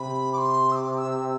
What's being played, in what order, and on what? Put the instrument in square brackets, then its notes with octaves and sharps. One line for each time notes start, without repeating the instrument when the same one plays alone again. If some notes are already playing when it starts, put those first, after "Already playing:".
Already playing: [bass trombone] C3 [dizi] B5
[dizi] D6
C6
E6
D6
E6